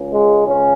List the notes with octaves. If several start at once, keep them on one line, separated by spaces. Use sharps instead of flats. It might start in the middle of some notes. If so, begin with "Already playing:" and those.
Already playing: C#2 C#3
G#3
C#3 C#4